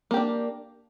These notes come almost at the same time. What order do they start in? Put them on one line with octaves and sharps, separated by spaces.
A#3 G4 D4